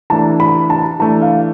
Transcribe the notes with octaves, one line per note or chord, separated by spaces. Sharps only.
E3 A3 D4 A5
B5
A5
E3 A3 D4 A5
F5